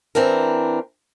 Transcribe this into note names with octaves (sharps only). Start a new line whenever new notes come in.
E3 C4 D4 A#4